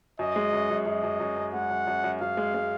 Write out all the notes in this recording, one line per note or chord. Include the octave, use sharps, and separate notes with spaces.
F#2 D#5
G#3
F#2
F#2
F#2 D#5
F#2
F#2
F#2
G#3 F#5
F#2
F#2
F#2
F#2 F5
G#3
G#3